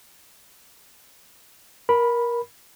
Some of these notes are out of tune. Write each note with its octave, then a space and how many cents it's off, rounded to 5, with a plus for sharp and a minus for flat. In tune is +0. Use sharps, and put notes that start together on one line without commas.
A#4 +20 B5 -5